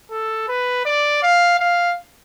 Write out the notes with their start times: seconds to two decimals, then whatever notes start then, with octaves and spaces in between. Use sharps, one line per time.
0.11 A4
0.48 B4
0.85 D5
1.23 F5
1.60 F5